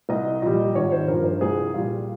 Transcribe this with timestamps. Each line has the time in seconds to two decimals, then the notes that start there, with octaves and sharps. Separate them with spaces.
0.09 C2 D#5
0.42 A#2 G3 D#5
0.75 G#1 C#5
0.92 C5
1.08 G2 F3 A#4
1.24 C5
1.41 C2 G#4
1.74 A#2 G3 F4